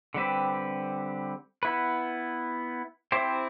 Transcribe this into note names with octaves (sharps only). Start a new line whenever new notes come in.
D3 G3 C4 G4 B4
B3 E4 B4
C4 E4 G4 C5